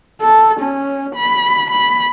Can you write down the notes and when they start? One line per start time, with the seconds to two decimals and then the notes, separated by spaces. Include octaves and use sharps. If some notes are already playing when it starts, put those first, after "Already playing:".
0.21 A4
0.61 C#4
1.16 B5
1.71 B5